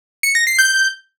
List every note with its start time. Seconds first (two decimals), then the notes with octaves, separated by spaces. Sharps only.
0.23 C#7
0.35 A#6
0.47 C7
0.59 G6